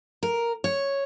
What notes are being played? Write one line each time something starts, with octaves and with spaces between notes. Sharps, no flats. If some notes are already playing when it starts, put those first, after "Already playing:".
A#4
C#5